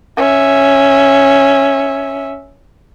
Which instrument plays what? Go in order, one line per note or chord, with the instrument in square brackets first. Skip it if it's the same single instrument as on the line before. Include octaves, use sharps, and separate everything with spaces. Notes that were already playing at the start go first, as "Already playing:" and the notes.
[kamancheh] C#4 E5